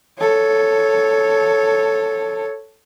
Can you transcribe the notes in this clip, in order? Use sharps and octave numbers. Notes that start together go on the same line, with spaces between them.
A4 C#5